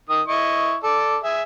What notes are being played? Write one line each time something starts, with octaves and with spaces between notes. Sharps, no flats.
D#3 D#6
E4 D#5 C#6
A4 D5
G#4 E5 G#5